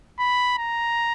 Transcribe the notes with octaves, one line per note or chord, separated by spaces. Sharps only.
B5
A#5